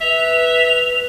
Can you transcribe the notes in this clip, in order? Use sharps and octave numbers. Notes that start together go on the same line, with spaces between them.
B4 E5 F7